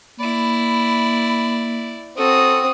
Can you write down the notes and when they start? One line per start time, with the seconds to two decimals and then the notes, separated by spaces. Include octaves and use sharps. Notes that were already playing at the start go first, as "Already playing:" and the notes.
0.19 A#3 E4 D5 B5
2.18 C4 F#4 A4 D#6